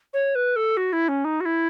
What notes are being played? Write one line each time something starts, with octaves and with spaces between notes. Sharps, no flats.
C#5
B4
A4
F#4
E4
C#4
D#4
F#4
E4